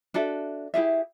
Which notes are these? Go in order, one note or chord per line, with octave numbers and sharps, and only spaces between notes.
D4 F#4 A4 E5
E4 G4 G#4 E5